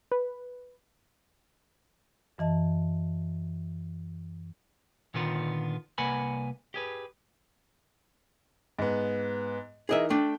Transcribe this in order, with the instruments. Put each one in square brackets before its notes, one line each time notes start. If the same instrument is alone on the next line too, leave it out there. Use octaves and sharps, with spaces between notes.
[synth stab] B4
[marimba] F#2 E3 D#5 A5
[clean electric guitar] A#2 D3 D#3 B3 C#4 F4
C2 A#3 B4 F#5 G#5 B5
G4 G#4 B4
[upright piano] G#2 B3
[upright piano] E3 D#4 A#4 [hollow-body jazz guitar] G#4 D#5 E5
[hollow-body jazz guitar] A3 D4 [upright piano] G5